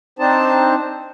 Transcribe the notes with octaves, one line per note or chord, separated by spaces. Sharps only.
C4 D4 D#4 C5 A5